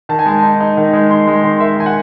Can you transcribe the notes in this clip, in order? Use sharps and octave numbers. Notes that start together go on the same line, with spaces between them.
D#3 A5
G#5
G#3 A5
D#4
D#4
D#3
G#3
D#3 C6
G#3
C6
D#3
D#3 E5
D#3 G#5
F#5